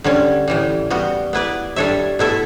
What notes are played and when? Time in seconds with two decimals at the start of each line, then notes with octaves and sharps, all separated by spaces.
0.04 D3 G3 C#4
0.48 A2 E3 G3
0.90 G3 B3 F#4
1.33 B3 E4 B4 D5
1.76 G3 D4 A4 C#5 E5
2.19 B2 A3 E4 A4 E5